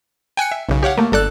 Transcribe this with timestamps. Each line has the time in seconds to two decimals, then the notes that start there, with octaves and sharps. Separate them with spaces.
0.37 G5 G#5 F#6 C#7
0.52 E5
0.69 B1 C#3
0.83 G4 C#5 F5 F#5
0.98 A3 A#3
1.12 G1 A4 D5 F#6